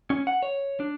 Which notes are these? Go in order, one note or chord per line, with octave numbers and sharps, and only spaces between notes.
C#4
F#5
C#5
D4